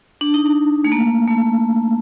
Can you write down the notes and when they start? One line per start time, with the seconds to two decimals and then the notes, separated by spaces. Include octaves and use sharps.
0.21 D4
0.34 D#4
0.46 D4
0.84 A3
0.92 A#3
1.27 A3